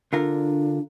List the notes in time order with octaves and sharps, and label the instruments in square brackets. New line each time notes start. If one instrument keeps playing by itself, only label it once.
[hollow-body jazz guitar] D3 F4 A#4 [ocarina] D4